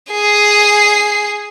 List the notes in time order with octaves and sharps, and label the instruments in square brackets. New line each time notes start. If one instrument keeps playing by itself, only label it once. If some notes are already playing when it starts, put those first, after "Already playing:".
[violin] G#4 C7